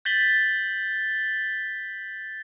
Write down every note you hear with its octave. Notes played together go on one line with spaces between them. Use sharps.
G6 A6 B6 F#7 G7